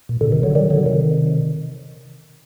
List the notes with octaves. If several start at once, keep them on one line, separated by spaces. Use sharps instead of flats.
A#2
A#2 D3
C3 D#3
D3 F#3
D#3 G3
D3 F#3
C3 D#3